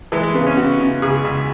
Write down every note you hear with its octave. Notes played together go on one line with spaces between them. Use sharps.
E3 G#3
G#3
C#3 B3
C#4
C#3 F#4
C#3
C#2 G#4
C#2